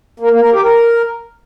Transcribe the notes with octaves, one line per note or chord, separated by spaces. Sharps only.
A#3
A#3
A#4
G4
A#4